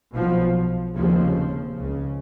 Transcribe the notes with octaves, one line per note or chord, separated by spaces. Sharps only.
B1 B2 F3
F1 D#2 C#3 F3
C#2 C#3